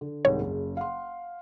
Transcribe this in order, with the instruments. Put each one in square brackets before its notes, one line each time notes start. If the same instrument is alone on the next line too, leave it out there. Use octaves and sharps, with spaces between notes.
[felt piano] D3
[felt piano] C2 G#2 D#3 [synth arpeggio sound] C#5
[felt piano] F#1 C#3
F5 F#5 C6